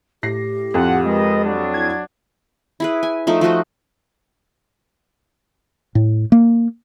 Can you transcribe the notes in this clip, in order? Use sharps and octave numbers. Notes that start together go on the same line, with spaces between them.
A2 G4 A#6 C7
F2 F4 F#5 A5
G#3 A#4 B4 D#5
F#3 D4
E4 G#6
E4 G#4 B4
G#5
F3 A3 D#4
F3 D#4 F#4 D#5
A2
A#3